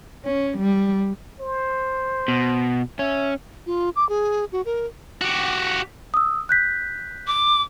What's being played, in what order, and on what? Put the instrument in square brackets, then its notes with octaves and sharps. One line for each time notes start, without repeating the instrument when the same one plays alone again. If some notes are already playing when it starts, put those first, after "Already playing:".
[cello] C#4
G3
[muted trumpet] C5
[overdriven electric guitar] B2
[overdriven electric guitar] C#4 [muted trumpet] E5
[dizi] F4
D6
G#4
F#4
A#4
[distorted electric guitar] F#4 G4
[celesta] D#6 E6
F#6 G6 B6
[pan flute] D6